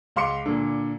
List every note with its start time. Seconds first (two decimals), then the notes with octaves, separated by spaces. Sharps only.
0.16 C#2 F5 C6 D6 C#7
0.46 A#2 D3